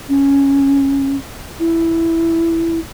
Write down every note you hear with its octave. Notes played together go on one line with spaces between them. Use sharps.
C#4
E4